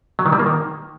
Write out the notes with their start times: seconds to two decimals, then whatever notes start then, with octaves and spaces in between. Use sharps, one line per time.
0.19 F#3
0.26 D#3
0.33 G3
0.39 A#3
0.46 D#3